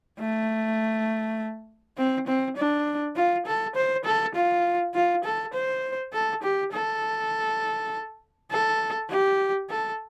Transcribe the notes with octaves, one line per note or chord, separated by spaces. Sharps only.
A3
C4
C4
D4
F4
A4
C5
A4
F4
F4
A4
C5
A4
G4
A4
A4
G4
A4